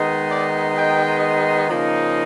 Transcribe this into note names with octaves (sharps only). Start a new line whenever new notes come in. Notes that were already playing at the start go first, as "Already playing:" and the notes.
Already playing: D#3 G#3 B3 D#4
D5
G5
C#3 F3 A#3 D#4